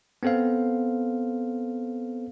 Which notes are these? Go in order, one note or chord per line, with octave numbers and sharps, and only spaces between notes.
B3 C4 A4 C5 F5